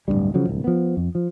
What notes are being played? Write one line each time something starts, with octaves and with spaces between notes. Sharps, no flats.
D1 C#2 G2 G3
C#3 F3 F#3
D1 C2
F3 B3
F2
F3